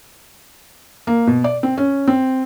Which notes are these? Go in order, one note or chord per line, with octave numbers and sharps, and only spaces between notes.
A#3
B2
D5
C4
C#4
C4